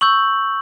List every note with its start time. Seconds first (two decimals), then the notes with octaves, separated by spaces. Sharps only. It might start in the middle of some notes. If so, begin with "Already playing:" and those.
0.01 C#6 E6 G6 F#7